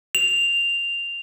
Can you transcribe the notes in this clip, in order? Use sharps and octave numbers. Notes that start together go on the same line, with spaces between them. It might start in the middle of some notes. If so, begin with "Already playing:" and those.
F7